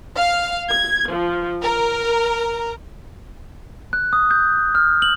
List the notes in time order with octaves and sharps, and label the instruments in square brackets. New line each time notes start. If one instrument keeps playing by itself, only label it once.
[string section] F5
G#6
F3
A#4
[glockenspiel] F#6
D#6
G6
F6
F#7